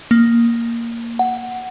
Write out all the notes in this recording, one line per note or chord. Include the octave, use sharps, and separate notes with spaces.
A#3
F#5